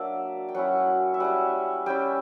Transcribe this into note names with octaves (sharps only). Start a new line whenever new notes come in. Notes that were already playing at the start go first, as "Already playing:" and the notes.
Already playing: F#3 A#3 D4 D5 E5
G5
F#3 C#4 E4 F#5
E5
G3 C#4 E4 F#5
G3 C#4 E4 G5